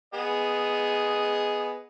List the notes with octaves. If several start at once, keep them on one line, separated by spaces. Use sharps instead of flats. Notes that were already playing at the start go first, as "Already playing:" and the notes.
B3 G#4 D#5